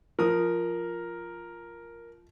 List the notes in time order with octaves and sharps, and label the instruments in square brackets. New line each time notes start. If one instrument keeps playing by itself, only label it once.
[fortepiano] F3 D#6 [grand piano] A#4